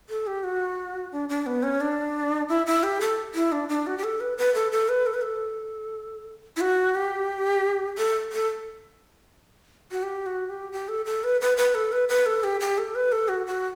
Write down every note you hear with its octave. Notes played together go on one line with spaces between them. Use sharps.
A4
G4
F#4
D4
D4
B3
C#4
D4
E4
E4
G4
A4
E4
D4
D4
F#4
G4
A4
B4
B4
A4
A4
B4
A4
B4
A4
E4
F#4
G4
A4
A4
F#4
G4
F#4
G4
G4
A4
A4
B4
B4
B4
A4
B4
B4
A4
G4
G4
A4
B4
A4
F#4
F#4